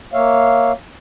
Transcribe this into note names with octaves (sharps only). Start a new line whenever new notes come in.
A#3 C#5 E5 F5